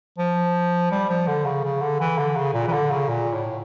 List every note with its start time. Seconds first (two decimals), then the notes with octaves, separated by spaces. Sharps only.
0.18 F3
0.91 G3
1.09 F3
1.27 D3
1.45 C#3
1.64 C#3
1.82 D3
2.00 E3
2.18 D3
2.36 C#3
2.54 A#2
2.68 E3
2.72 D3
2.91 C#3
3.09 A#2
3.33 A2